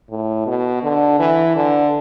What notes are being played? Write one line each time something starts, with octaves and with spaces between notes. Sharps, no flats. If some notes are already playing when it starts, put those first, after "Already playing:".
A2
B2
D3
E3
D3